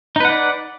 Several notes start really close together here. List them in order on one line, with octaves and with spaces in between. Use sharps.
D#4 B4 F#5 D5